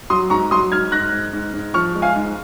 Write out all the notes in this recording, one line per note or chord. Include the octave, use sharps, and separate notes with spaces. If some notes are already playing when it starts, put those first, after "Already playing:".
F#3 C6 D#6
G#2 A#5 C#6
F#3 C6 D#6
G#2 F6 G#6
G#2 F#6 A#6
G#2
G#2
G#2
F3 C#6 F6
G#3
F5 G#5
G#2